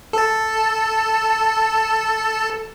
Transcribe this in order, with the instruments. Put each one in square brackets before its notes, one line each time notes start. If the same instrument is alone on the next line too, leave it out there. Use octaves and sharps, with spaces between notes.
[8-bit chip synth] A4 A5